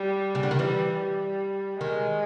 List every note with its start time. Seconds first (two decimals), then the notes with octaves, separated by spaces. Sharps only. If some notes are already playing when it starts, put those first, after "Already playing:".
Already playing: G3
0.35 C#3
0.43 D3
0.51 D#3
0.58 E3 G3
1.00 G3
1.81 D#3 G#3